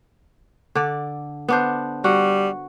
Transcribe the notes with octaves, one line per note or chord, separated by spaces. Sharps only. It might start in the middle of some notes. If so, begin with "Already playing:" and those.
D3 D5
B3 D4 C5
G3 F#4